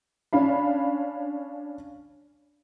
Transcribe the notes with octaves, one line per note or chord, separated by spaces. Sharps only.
C#4 D4 F5 B5